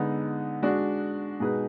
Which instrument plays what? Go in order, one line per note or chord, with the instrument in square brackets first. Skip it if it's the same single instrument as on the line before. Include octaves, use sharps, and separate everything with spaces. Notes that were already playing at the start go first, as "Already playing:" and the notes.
Already playing: [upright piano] D3 G#3 B3 D#4
G#3 D4 F#4
B2 G#3 D#4 G#4 B4